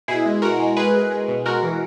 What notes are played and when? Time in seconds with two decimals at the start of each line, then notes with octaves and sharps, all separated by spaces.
0.08 B2 E4 G#4
0.26 G#3
0.42 B2 F#4 A#4
0.59 G#3
0.77 G#3 G#4 B4
0.94 G#3
1.11 G#3
1.28 B2
1.46 G#3 F#4 A#4
1.63 E3